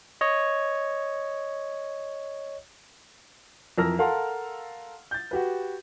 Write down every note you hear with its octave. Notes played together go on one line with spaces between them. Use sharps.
C#5 D#5
F2 E3 A#4 E6 F6 A#6
A4 A#4 F5 F#5 A5 C6
G6 A6
F#4 G4 B4